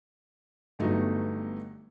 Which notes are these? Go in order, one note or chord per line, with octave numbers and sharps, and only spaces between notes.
G1 G2 F#3 A3 B3 D#4